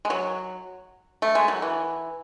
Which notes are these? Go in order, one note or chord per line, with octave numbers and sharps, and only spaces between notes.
G#3
F#3
A3
G#3
F#3
E3